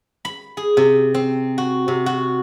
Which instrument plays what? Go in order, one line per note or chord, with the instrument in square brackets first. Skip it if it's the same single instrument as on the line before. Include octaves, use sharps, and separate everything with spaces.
[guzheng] B5
G#4
C3
C4
F#4
C3
F#4